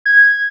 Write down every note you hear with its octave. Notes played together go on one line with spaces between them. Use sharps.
G#6